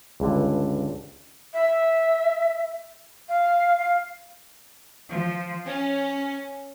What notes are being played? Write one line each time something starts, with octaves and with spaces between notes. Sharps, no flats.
C#2 G2 D3
E5
F5
F5
F3
C#4